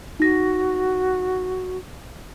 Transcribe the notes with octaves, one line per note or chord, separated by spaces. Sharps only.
D#4 F#4 A#6